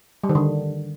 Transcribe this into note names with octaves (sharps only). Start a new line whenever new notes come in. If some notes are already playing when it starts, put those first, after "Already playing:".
G3
D#3
D3